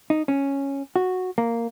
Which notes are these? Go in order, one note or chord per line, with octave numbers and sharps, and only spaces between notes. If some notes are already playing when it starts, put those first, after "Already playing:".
D#4
C#4
F#4
A#3